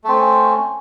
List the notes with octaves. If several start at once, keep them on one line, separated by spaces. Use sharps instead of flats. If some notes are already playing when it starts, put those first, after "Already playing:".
A3 C4 C#4